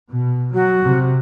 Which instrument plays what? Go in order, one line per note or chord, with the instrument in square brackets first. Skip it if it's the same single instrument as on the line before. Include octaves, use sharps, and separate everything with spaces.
[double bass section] B2
[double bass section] F#3 [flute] F#4
[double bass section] C3